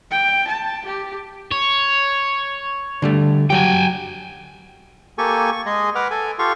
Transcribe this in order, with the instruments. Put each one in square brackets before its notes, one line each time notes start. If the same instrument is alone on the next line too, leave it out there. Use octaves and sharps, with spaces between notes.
[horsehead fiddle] G5
A5
G4
[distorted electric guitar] C#5
[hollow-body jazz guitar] D3 G3 A3
[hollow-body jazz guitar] F#3 G4 [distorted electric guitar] G5 G#5
[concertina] A#3 G4 A4 G#5 C#6
C#6
G#3 G#4 D#5
B4 F#5 D6 F6
A4 G#5
F4 G4 A4 F5 C#6